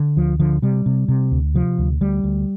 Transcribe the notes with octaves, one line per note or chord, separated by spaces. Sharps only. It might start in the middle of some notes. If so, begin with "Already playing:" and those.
Already playing: D3
D2 F3
D3 F3
C3 G3
C3
C3
D2
C3 F3
D2
D2 G3
D2